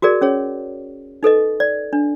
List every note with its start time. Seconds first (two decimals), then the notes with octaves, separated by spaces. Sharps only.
0.02 F#4 G#4 A#4 D5
0.21 C#4 G#4 C#5
1.23 D#4 A4 B4 D#5
1.60 D5
1.93 D4